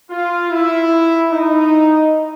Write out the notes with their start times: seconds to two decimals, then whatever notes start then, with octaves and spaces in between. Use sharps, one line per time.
0.10 F4
0.51 E4
1.31 D#4